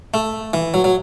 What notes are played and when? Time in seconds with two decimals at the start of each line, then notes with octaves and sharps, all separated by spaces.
0.14 A3
0.54 E3
0.74 F#3
0.84 F#3